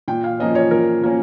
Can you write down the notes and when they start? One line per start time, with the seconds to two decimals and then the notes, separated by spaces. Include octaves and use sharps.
0.08 A#2 G5
0.24 F5
0.40 F3 A#3 C#4 D#5
0.55 C#5
0.71 A#2 A#4
1.02 F3 A#3 C#4